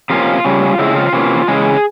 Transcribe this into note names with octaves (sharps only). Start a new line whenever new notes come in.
C3 F3 A#3 C#4 F4
C#3 G3 C#4
C#3 F3 G#3 C4 E4
F4
C3 E3 A#3 C#4
C#3 E3 G#3 G#4